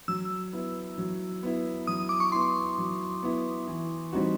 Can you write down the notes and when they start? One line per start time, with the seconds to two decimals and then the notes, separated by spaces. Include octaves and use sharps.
0.08 F#3 E6
0.53 B3 E4
0.98 F#3
1.43 B3 E4
1.87 F#3 D#6
2.09 D6
2.20 C#6
2.32 B3 E4 C6
2.78 F#3
3.23 B3 E4
3.67 E3
4.13 G3 C4 D#4 F#4